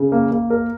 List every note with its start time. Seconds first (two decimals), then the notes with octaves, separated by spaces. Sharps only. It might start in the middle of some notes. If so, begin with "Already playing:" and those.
Already playing: C#3
0.12 A#3
0.31 A#3
0.50 A#4